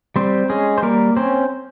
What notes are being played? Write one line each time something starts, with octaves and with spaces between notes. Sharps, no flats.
G3 C4 C5
G#3 C#4 G#4
C5
G3 A#3 A#4
C4 C#4 C5